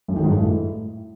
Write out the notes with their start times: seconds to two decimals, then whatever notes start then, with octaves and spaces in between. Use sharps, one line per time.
0.08 F#2
0.16 D#3
0.24 G#2
0.32 G2
0.39 A2